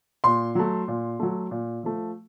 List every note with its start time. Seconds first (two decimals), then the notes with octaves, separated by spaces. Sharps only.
0.24 A#2 C6
0.55 F#3 A3
0.88 A#2
1.19 F#3 A3
1.51 A#2
1.83 F3 A3